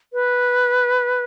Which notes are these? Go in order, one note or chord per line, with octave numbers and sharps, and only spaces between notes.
B4